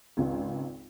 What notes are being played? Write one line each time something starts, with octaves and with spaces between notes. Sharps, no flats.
G#1 C#2 F4